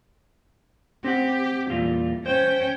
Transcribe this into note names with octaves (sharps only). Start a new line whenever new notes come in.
C4 G4 F#5
E2 A#2 G3 F4
C#4 C5 G5